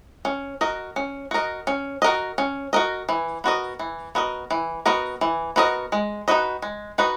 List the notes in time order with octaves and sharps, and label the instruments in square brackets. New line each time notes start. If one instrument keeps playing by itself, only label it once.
[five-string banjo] C#4
F#4 A#4 D#5
C#4
F#4 A#4 D#5
C#4
F#4 A#4 D#5
C#4
F#4 A#4 D#5
E3
B3 F#4 A#4 D#5
E3
B3 F#4 A#4 D#5
E3
B3 F#4 A#4 D#5
E3
B3 F#4 A#4 D#5
G#3
D#4 F#4 B4 D#5
G#3
D#4 F#4 B4 D#5